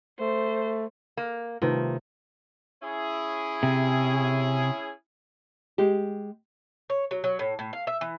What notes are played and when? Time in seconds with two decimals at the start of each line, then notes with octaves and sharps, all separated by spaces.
0.20 A3 C5
1.17 A#3
1.62 C3 D#3 A3 F4 B4
2.82 C#4 E4 G#4
3.63 C3
5.78 G#3 G4
6.90 C#5
7.11 F#3
7.24 F#3
7.39 A2
7.59 A2
7.73 F5
7.87 E5
8.01 E3